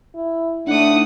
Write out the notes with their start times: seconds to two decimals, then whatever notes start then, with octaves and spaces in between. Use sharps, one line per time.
0.15 E4
0.67 A2 A3 D4 D#4 D5 F#5 D#6